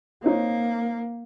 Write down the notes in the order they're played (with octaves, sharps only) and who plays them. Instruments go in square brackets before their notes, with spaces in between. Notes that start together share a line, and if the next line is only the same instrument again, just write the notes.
[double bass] A#3 [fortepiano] C4 D#4 C#5